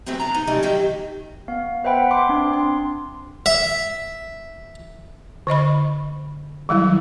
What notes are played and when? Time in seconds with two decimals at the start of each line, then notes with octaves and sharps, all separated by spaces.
0.06 E3 F#3 A3 B3 C4
0.20 D4 A#5
0.34 D#4
0.47 C#3 E3 F#3 G3 A3 D#4
0.63 D#3 F#3 G4
1.48 B3 F5
1.84 B4 C5 E5 F#5 G5 B5
2.11 C6 D6
2.29 C4 D4
2.52 C4 C6
3.46 E5
5.47 D3 C5 D#5 B5
6.69 D#3 F#3 G3 E4